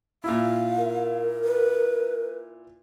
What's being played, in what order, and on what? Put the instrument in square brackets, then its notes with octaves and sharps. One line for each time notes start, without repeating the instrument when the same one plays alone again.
[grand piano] A#2 E4 [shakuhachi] F5
[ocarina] A#4
[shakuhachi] B4